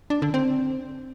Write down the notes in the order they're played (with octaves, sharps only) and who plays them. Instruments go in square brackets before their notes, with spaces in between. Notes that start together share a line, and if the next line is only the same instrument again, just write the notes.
[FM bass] D4
D3
C4